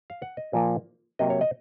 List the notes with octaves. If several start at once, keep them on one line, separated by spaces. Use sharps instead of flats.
F5
F#5
D#5
A#2 F3 A#3
C3 F#3 A#3 D#5
C#5
D#5